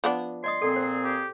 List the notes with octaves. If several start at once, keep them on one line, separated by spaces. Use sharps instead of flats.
F3 B3 D4
D5 D#5 C6 D#6
A#2 C4 G#4 A4
C5
G4